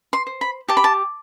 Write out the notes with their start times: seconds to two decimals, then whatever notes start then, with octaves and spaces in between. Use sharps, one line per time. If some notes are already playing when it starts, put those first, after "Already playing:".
0.13 C6
0.27 C5
0.41 B5
0.68 G4 A5
0.77 B5
0.84 A5